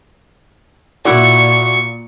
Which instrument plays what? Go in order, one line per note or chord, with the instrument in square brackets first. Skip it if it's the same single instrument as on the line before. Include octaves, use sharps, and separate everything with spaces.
[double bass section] A#2 [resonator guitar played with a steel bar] E4 F#4 D5 [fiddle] C#6